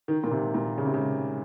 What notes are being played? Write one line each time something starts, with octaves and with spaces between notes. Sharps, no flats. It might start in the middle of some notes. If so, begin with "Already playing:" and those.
D#3
A#2
C3
A#2
C#3
C3
C#3